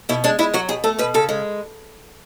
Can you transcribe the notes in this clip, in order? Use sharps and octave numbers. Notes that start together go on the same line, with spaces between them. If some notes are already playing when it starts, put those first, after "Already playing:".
B2 E4
G#3 D4
G#3 E4
F#3 F#4
B2 G#4
A3 A4
B2 B4
C#3 A4
G#3